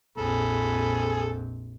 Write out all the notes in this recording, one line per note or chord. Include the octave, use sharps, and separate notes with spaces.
A#1 F2 G#4 A4 B5